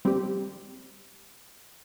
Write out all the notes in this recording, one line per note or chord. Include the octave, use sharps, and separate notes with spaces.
G3 C4 G4